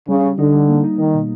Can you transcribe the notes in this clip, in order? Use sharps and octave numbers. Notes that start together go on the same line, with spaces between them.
C#3 G3
G3
D3 D#4
G3
A#3
D#4
D#3 D#4
B2